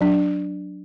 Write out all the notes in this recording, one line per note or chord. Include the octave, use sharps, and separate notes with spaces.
F#3 D4